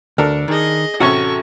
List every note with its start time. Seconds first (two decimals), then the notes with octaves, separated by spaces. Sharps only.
0.18 D2 D4 A4 A#4
0.48 D#3 G#4 D#5
1.00 A1 C3 C#4 F#4 A4 C#6